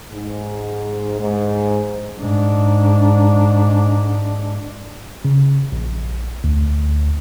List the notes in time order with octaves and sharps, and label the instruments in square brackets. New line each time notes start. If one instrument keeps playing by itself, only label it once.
[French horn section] G#2
G#2
[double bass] G#2 D4
[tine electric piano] C#3
A#1
D2